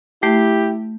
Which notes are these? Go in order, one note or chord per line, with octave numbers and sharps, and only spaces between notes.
A3 E4 G4